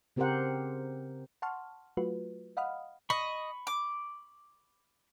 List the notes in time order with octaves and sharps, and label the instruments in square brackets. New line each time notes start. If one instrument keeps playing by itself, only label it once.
[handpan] C#3 C4 G4 A#4 C5 F#5
[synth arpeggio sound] F#5 A5 C6 C#6 F6
F#3 A3 F4 F#4 B4
D#5 F5 F#5 B5 D#6 F6
[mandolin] D#5 [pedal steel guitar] B5 C#6
[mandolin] D6